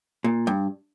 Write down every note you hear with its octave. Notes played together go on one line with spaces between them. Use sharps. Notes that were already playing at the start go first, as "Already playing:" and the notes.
A#2
G2